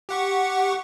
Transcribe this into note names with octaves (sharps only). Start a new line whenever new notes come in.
G4 F#5 C#6